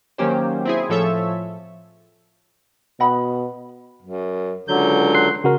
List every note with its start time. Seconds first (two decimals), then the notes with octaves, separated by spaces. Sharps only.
0.18 D#3 F#3 A#3 C#4 G4 C5
0.65 C4 E4 G#4
0.89 A2 F3 A4 C#5 E5
3.00 B2 D#5 F#5 B5
4.02 F#2
4.68 C#2 D3 F#3 G6
5.15 C6 F#6 C7
5.44 C#3 F#4 A#4